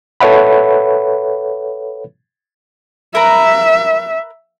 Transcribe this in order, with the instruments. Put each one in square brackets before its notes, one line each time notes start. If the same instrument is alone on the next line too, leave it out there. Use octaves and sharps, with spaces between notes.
[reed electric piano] A4 B4 C#5 E5 F#5 B5
[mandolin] A#4 B4 A#5 [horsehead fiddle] E5